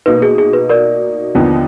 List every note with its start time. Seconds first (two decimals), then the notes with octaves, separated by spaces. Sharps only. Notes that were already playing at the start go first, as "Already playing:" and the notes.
0.06 B2 A#3 D#4 B4
0.22 G#4
0.38 G#4
0.53 B4
0.69 A#4 D5
1.35 D#2 D3 F3 B3 D#4